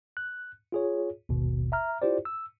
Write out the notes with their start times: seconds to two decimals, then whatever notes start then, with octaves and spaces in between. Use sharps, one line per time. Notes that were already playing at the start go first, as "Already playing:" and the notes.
0.17 F#6
0.72 F4 G#4 C#5
1.29 G#1 D#2 B2
1.72 E5 A#5 F6
2.02 E4 F4 G4 C5 D5
2.25 E6